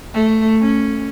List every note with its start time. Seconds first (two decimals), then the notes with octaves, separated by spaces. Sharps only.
0.13 A3
0.60 C#4